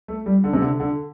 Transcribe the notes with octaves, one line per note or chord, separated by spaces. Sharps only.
A3
G3
D3
C3
D3
D3